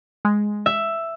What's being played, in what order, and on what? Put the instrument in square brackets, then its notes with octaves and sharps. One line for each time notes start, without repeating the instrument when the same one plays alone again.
[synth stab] G#3
[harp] E5